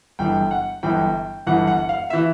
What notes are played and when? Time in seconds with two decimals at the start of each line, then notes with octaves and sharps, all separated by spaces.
0.19 G1 G2 E3 G5
0.51 F#5
0.83 G1 G2 E3 G5
1.47 G1 G2 E3 F#5
1.67 F#5
1.89 F5
2.10 E3 E5